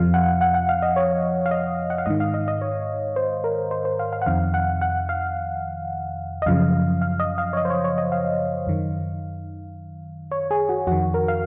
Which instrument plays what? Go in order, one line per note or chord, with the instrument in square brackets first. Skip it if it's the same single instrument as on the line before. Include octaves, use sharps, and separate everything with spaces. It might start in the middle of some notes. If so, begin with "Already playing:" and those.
Already playing: [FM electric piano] F2 C3 F3 F5
F#5
F#5
F#5
F5
D#5
C#5
F5
D#5
F#5
F5
G#2 D#3 D#5
F5
D#5
D#5
C#5
C5
A#4
C5
C5
F5
F5
F#5
F2 C3 D#3 F5
F#5
F#5
F5
D#5
F#2 C#3 F3 F5
F5
D#5
F5
C#5
D#5
C5
C#5
C#5
D#5
F5
F#2 D#3
C#5
G#4
F#4
F2 D#3 F#4
A#4
F5